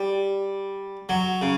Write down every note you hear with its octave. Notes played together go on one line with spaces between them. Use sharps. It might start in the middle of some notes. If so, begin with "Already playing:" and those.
Already playing: G3
F#3
C#3